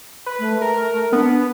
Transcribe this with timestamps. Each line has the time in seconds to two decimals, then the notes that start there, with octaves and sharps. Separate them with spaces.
0.26 B4
0.39 A3
0.61 A#4
1.13 B3 D4